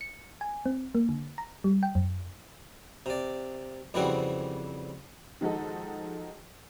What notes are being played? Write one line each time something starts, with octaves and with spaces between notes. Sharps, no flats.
C#7
G#5
C4
A#3
D3
A#5
G3
G5
F#2
C3 D5
F2 C#3 E3 G3 C4 F#4
D#3 F3 G#3 D#4 F#4 A4